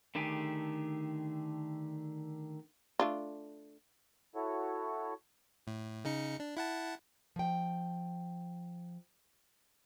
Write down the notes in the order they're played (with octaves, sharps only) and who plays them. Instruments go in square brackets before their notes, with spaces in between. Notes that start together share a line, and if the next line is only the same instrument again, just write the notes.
[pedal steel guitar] D3 D#3 A3 G4 G#4
[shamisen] A3 D4 F4
[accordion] E4 F#4 A4 C#5
[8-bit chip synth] A2
C#3 D#4 C#7
D4
E4 F#5 A5
[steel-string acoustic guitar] F3 G5